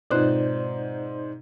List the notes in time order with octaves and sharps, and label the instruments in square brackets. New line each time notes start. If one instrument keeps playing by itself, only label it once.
[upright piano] G#2 C4 [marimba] B2 F4 F#6 [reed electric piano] D#4 C5 D5